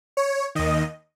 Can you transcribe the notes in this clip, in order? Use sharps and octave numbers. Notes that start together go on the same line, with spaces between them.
C#5
D#2 D#3 D#5